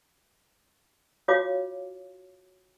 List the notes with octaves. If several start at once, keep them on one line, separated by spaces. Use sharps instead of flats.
F4 F#4 C#5 F5 D6